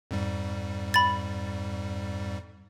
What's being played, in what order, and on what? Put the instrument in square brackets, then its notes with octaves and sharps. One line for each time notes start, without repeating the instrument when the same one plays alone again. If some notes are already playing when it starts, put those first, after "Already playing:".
[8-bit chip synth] F2 G#2 G3
[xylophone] B5 A6